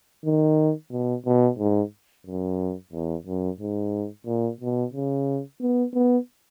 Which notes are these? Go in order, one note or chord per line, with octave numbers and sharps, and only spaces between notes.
D#3
B2
B2
G#2
F#2
E2
F#2
G#2
A#2
B2
C#3
B3
B3